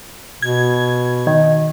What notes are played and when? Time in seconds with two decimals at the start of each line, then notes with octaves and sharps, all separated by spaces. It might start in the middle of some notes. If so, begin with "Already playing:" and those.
0.42 B2 G#6
1.27 D#3